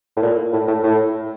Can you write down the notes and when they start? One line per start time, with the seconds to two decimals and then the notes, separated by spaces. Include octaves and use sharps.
0.17 A2
0.22 A#2
0.52 A2
0.67 A2
0.83 A2